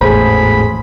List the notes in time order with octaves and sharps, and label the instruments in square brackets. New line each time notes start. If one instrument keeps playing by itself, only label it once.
[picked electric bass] G#1 E2 A2 [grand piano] G#4 C5 [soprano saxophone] B5